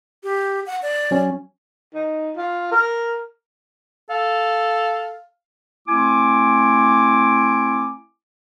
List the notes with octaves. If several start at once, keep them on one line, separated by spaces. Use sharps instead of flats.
G4
F#5
D5
F#3 C#4
D#4
F4
A#4
A4 F5
A3 C4 E4 G#5 D6